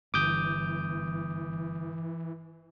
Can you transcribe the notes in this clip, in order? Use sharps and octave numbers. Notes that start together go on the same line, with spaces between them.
G1 E3 D6 D#6 G6